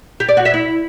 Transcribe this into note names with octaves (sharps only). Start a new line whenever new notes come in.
G4
D5
F#4
E5
E4